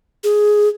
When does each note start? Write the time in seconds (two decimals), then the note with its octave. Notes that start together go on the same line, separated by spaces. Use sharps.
0.24 G#4